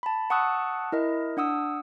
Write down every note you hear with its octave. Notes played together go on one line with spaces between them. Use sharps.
A5 B5
F#5 A5 C#6 D#6 E6 F#6
E4 A#4 D#5
D4 F#5 D#6 E6